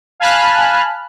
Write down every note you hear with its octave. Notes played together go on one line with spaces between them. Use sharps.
F5 G#5 A5 B5 F6 F#6